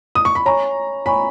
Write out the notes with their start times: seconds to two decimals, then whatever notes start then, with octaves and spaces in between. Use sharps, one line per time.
0.15 D#6
0.25 C#6
0.35 B5
0.46 C#5 G#5 A#5 C#6
1.06 C#5 G#5 B5 C#6